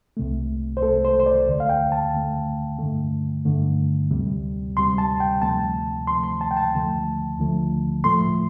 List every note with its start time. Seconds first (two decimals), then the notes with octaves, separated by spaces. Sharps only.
0.17 C2 C3 A3
0.77 C5
0.82 C2 C3 A3 A4
1.05 C5
1.20 C5
1.26 D5
1.48 D2 D3 A3
1.60 F5
1.69 G5
1.92 A5
2.14 D2 D3 A3
2.79 G2 D3 A3
3.45 G2 D3 A3
4.11 D2 C3 G3
4.76 D2 C3 G3 C6
4.98 A5
5.20 G5
5.41 D2 C3 F3 A3 A5
6.07 D2 C3 F3 A3 C6
6.24 C6
6.41 A5
6.51 G5
6.57 A5
6.73 D2 D3 F3 A3
7.39 D2 D3 F3 A3
8.04 A2 F3 A3 C6